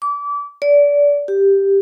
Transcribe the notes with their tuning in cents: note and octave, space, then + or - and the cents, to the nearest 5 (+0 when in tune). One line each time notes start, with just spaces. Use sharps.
D6 -30
D5 -25
G4 +5